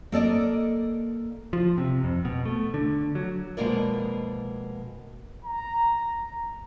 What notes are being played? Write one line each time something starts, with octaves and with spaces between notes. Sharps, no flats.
A#3 A4 D5 D#5
F3
C3
F2
B2
A3
D3
F#3
F2 B2 G#3 A#3 A#4 D5
A#5